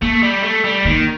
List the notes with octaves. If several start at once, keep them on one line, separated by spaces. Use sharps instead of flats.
A3 A#3
G3
A3
G3
D#3 A#3